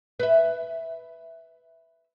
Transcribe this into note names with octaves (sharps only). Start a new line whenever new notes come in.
B4 E5